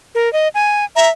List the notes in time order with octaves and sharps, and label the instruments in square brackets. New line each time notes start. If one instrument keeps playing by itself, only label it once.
[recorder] A#4
D#5
G#5
[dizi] E5 [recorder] A#5